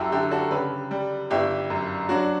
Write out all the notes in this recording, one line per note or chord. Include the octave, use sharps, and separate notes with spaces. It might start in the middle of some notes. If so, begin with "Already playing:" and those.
Already playing: F#2 E4 F#4 G4 A4
D3 E4 G4
F#4 A4
C#3 G4 B4
G3
G1 E4 G4
F#2
F#3 D4 F#4